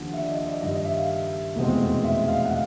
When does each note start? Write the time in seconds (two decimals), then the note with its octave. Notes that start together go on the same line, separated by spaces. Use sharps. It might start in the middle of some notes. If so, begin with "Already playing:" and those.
Already playing: D#2 D3 F3
0.13 E5
0.22 D5
0.30 D#5
0.46 D5
0.61 G2 D#3 G3 D#5
0.73 D#5
0.85 E5
0.97 F5
1.56 F1 E2 B2 G#3 C4
2.04 E5
2.28 F5
2.45 F#5
2.51 F5